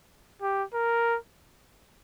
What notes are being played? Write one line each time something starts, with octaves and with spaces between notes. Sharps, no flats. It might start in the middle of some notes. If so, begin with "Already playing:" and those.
G4
A#4